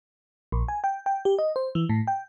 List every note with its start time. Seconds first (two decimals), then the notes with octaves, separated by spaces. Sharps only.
0.52 A#1
0.68 G#5
0.84 G5
1.06 G5
1.25 G4
1.39 D#5
1.56 C5
1.75 E3
1.89 A2
2.07 G5